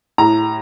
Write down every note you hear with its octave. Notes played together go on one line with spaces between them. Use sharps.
A2 A#5